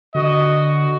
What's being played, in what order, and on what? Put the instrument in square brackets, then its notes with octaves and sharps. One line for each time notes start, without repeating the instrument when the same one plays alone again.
[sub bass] D3 [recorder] F#4 [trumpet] D#5